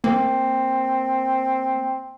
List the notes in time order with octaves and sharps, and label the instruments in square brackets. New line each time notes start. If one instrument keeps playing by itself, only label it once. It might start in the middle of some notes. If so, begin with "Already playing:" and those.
[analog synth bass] A#3 [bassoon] C4